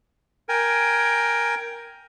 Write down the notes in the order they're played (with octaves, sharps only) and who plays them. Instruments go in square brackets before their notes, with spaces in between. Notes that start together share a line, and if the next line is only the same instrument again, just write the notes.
[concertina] A#4 G5 G#5